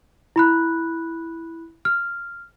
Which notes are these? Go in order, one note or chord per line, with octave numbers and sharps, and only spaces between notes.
E4 B5 F#6
F6